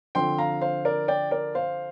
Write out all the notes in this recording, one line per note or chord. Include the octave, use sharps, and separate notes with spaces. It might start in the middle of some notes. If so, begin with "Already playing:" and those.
D3 F3 C4 G5 C6
F5 A#5
C5 F5
A#4 D5
D5 G5
A#4 D5
C5 F5